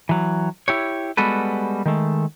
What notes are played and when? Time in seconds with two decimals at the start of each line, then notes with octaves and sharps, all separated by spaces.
0.09 E3 F#3
0.68 E4 G4 C#5
1.17 G3 G#3 B3 F#4 A4 B4
1.86 D#3 G#3 A3